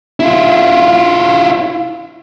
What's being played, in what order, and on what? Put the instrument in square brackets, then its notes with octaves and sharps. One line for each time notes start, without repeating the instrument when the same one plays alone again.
[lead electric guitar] E4 F4